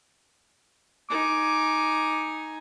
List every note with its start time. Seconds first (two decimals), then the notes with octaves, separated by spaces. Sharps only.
1.10 D#4 G#5 D6